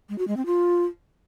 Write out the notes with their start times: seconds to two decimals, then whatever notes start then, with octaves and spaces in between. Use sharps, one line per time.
0.09 G#3
0.18 F#4
0.28 G#3
0.37 C4
0.46 F4